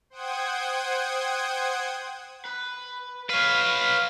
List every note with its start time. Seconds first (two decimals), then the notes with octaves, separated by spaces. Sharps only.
0.10 C5 F#5 G5 D#6 G#6
2.45 B4
3.30 B4 C#5 F5